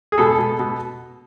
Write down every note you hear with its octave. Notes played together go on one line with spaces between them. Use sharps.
G#4
B2 A4
B2
B2